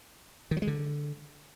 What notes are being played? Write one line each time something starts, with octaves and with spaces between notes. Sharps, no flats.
D#3
F#3
G#3
D3